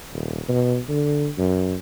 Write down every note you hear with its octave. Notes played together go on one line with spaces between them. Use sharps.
D#1
B2
D3
F#2